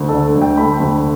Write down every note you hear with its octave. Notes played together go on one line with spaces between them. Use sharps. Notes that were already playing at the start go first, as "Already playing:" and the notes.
Already playing: D2
A4
D3
D2
G5
A3 B5
D2